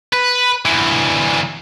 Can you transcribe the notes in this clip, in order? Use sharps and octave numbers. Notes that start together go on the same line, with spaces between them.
B4
D2 E3